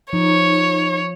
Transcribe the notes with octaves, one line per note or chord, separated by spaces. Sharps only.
F3 D#4 C#5